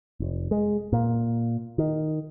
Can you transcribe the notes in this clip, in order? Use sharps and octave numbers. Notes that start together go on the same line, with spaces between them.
F1
G#3
A#2
D#3